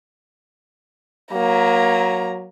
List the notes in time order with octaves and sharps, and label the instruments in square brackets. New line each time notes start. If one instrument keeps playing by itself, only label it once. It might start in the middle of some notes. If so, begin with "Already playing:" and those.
[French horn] F#3 [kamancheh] A#3 A#5